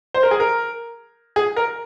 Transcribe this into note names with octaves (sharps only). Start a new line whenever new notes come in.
C5
A#4
G#4
A#4
G#4
A#4